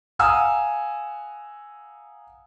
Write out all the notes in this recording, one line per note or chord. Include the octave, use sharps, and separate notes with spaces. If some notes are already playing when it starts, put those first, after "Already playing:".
F5 F#5 G#5 A#5 D#6 E6